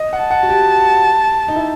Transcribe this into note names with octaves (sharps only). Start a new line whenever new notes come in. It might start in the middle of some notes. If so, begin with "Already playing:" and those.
Already playing: D#5
F#5
A5
F#5
F#4
G4
D#4
E4